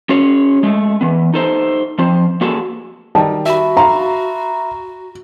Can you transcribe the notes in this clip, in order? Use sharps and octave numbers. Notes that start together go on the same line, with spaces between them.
C#4 F#4 G#4 C#5
G#3 A3
E3 B3
D#4 A4 C5
F3 C4 C5
A#3 F#4 G#4 A4
D#3 G3 A5
F#4 E5 B5
F5 A5 A#5 C6